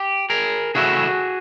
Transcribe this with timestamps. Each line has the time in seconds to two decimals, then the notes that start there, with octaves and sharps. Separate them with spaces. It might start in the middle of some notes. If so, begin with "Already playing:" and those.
Already playing: G4
0.30 G#4 A#4
0.75 C#3 E3 A3 C#4 E4 F#4 G#4